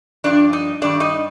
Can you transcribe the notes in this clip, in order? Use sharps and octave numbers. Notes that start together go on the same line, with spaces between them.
G2 F3 D4 D5
D#4 D#5
G2 D#3 G3 D4 D5
D#4 D#5